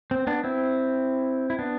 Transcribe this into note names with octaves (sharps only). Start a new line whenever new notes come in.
C4
B3 D4
C4 E4
E4
B3 D4